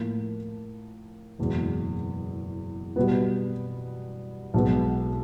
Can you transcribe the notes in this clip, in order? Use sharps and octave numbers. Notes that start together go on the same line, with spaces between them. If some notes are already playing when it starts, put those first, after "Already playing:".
Already playing: A2 F3 A#3
F#1 E2 B2 G#3
B2 G3 B3
B1 B2 G#3 B3